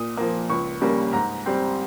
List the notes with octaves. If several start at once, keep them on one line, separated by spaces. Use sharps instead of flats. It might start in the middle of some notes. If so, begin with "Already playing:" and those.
Already playing: A#2 D#6
F3 A#3
C#2 C#6
C#3 G3 A#3
G#2 A#5
G3 C4